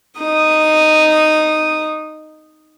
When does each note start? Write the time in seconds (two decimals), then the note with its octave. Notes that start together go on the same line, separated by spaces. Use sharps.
0.19 D#4 D#6